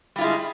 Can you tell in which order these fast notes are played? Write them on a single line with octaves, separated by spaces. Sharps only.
G3 F4 E4 G#3